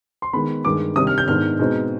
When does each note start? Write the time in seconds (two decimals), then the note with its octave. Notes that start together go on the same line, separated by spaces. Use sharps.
0.22 C6
0.33 D#3 G#3 B3 B5
0.65 G2 D#3 G#3 D6
0.96 C3 D#3 G3 D4 D#6
1.07 F6
1.18 G6
1.27 G#2 D#3 G#3 B3 D4 F6
1.59 B2 G#3 C4 D#4